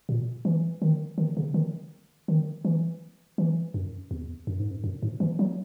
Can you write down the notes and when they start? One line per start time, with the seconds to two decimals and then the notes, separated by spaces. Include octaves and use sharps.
0.09 A#2
0.45 E3
0.82 D#3
1.18 D#3
1.37 C#3
1.54 D#3
2.28 D#3
2.65 E3
3.38 E3
3.74 F#2
4.11 E2
4.47 F#2
4.59 G#2
4.71 F#2
4.84 F#2
5.03 G#2
5.20 E3
5.39 F#3